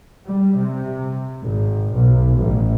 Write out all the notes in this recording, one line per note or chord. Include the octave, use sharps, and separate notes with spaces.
G3
C3
G#1
B1
A1